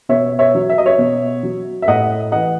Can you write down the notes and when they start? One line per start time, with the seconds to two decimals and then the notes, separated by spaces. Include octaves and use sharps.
0.09 B2 C#5 E5
0.39 C#5 E5
0.55 F#3
0.70 E5
0.78 D#5
0.86 C#5 E5
0.98 B2
1.43 F#3
1.82 E5
1.88 A2 D#5 F#5
2.32 E3 D#5 F#5